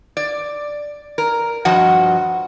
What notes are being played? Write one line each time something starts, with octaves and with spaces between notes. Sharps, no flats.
D5
A#4
G2 F3 F#4 D#5 F#5